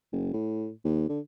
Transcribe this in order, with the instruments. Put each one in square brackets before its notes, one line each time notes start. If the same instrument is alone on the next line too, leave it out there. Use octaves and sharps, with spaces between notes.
[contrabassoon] F#1
A2
D#2
D3